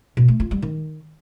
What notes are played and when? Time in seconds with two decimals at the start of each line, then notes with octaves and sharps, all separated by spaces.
0.17 B2
0.28 A3
0.40 F4
0.51 G3
0.62 D#3